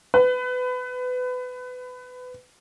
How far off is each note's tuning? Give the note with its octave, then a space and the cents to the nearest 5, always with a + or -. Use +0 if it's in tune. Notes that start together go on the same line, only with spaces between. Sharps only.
B4 +25